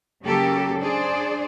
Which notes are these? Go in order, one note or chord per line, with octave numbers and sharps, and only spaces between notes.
C#3 F#3 A#3 G4 A4
D4 G#4 C5 D5